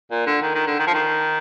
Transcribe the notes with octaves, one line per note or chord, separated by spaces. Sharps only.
A#2
D3
D#3
D#3
D3
D#3
F3
D#3